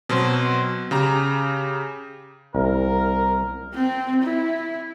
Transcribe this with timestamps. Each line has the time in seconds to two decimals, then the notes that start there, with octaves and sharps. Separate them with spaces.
0.09 B2 F#3 C4 C6
0.91 C#3 G4 A#5
2.55 C2 A#4
3.74 C4
4.23 E4